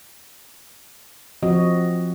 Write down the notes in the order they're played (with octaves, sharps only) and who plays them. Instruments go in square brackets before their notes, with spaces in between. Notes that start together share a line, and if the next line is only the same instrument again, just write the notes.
[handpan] F3 C4 F#4 D#5